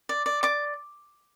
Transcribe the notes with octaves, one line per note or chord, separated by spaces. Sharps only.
D5
D5
D5 D6